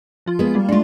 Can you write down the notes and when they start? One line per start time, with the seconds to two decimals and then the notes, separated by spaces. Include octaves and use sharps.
0.26 F3 F4
0.39 G#3 B3
0.54 G3 A#3 F4
0.69 G#3 A3 D4 F4